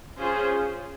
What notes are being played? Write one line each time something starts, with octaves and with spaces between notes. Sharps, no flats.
C#4 F4 G#4 C5